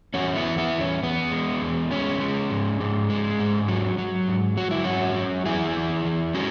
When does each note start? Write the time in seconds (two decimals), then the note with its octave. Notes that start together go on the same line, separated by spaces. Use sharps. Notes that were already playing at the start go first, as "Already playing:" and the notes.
0.14 E2 C#4 F#4
0.36 B3 E4
0.44 E2
0.58 B3 E4
0.73 E2
0.81 C#4
1.03 E2 B3
1.32 G#3
1.62 E2
1.91 G#3 C#4
2.21 G#3
2.50 G#2
2.80 G#2
3.10 G#3
3.40 G#2
3.68 F#3
3.98 F#3
4.28 G#2
4.57 F#3 F#4
4.71 E4
4.84 G#2 C#4 F#4
5.16 F#3
5.45 E2 E4 G#4
5.76 E2
6.05 E2
6.34 G#3 C#4 F#4